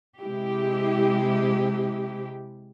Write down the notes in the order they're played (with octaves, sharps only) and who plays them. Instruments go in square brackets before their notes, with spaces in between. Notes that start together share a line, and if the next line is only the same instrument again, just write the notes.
[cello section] C3 G#3 E4 G4